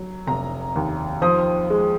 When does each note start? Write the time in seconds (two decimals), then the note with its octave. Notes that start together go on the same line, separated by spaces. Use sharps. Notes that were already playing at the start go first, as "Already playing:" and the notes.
Already playing: F#3
0.27 F1 A#5
0.76 D#2
1.22 F3 D#6
1.70 G#3